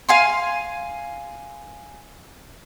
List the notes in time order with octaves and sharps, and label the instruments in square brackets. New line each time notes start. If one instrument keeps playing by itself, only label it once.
[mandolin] F5 G#5 C6